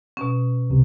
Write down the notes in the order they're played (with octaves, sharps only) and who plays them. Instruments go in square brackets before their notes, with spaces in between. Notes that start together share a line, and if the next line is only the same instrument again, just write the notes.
[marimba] B2 C#4
[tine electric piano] C2 C3